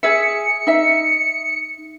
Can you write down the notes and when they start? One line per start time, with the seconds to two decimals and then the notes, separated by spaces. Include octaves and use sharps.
0.03 G#4 E5 C#7
0.67 D#4 E5